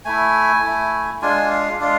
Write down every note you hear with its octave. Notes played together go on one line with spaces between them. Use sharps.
A3 E4 G#5
A3 E4
G#3 D4 F4 G#5
F5
G#3 D4 F4 F5